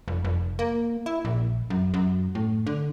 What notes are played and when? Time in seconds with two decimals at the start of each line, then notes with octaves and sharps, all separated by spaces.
0.08 F1
0.24 F1
0.59 A#3
1.06 E4
1.25 A#1
1.70 F#2
1.94 F#2
2.35 A2
2.67 D3